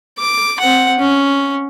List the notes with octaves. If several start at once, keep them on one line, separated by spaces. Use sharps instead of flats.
D6
C4 F#5
C#4